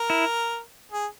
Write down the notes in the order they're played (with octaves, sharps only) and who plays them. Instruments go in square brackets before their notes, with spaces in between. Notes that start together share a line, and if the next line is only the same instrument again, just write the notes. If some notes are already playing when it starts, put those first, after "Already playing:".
Already playing: [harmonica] A#4
[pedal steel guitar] E4
[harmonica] G#4